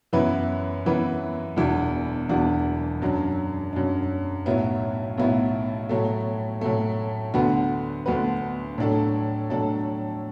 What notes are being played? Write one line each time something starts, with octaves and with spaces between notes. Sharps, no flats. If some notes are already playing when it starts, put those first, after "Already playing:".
F#2 E3 B3 E4 B4
F#2 E3 B3 E4 B4
E1 E2 E3 D4 F#4
E1 E2 E3 D4 F#4
F#2 F#3 D4
F#2 F#3 D4
B1 A2 F#3 B3 E4
B1 A2 F#3 B3 E4
A2 F#3 A3
A2 F#3 A3
D2 D3 B3 F#4 B4
D2 D3 B3 F#4 B4
A2 F#3 D4 A4
A2 F#3 D4 A4